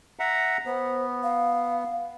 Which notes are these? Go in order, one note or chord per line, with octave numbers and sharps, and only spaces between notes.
E5 F#5 A#5
B3 C5
F5